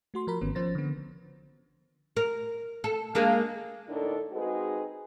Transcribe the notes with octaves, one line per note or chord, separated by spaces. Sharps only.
A3 F#4 C6
F3 A#4 B5
G#1 D#3 B3 C#4
F3 C#4 C5 A6 A#6
D3 B3
A#4
A4
G#3 A#3 D4
A2 D3 D4 D#4 A4 A#4
G#3 C4 D#4 F#4 G#4 B4